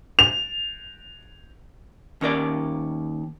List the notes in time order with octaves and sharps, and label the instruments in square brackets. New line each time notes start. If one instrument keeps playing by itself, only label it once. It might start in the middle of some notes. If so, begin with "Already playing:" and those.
[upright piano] F7
[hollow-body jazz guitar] D#2 C#4 A#4 D5